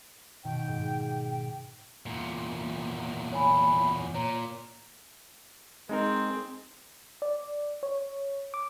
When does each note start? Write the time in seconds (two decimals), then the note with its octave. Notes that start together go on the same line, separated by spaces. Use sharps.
0.44 B2 D#3 G5
0.68 G#2
2.06 E2 A#2
3.32 C#5 G#5 B5
4.15 A#2 C#5 A#5
5.89 G#3 C4 D#4 G#4 A#4
7.22 D5
7.83 C#5
8.54 D6